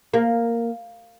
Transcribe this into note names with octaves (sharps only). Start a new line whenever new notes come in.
A#3